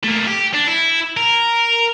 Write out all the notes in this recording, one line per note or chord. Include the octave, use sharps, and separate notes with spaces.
A3 A#3
G4
D4
E4
A#4